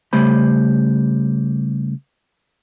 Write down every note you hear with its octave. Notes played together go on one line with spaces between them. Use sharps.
C#3 G3 A3 C5 B5